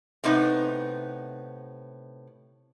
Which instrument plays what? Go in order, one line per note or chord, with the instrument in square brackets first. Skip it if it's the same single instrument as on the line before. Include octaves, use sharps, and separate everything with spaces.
[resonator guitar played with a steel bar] A2 C3 B3 D#4